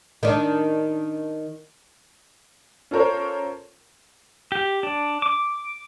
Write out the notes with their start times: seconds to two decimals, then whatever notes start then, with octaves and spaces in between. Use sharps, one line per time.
0.23 D#3 D4
2.91 C#4 F4 A4 A#4 C5 C#5
4.52 G4
4.83 D4
5.22 D6